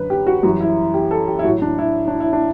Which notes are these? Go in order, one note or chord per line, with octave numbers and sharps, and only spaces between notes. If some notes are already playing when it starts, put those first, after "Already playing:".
Already playing: F#2 D3 F#3 B4
G4
F#4
F#2 E3 G3 F#4
E4
G4
A4
G4
E4
A2 F#3 F#4
D4
E4
D4
E4
D4